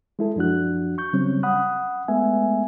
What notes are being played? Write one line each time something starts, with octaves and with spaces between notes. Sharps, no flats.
G#3 E4 A4
F#2 F3 D4 F#4 F#6
C#6 G6
C#3 F#3 G3 C4 C#4
F#5 B5 D#6 F#6
G#3 A3 B3 E5 G#5